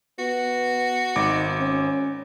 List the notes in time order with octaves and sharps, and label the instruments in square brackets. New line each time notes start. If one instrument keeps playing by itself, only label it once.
[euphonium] B3 [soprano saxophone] F#4
[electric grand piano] G#1 D6 [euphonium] D#4
[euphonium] C#4